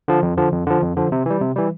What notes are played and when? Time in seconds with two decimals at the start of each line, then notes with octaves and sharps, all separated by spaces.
0.08 D3 F3
0.22 F2
0.38 D3 F3
0.53 F2
0.67 D3 F3
0.82 F2
0.97 D3 F3
1.12 C3
1.26 E3 G3
1.41 C3
1.56 E3 G3